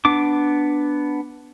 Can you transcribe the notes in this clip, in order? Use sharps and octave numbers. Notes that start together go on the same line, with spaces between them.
B3 D4 D6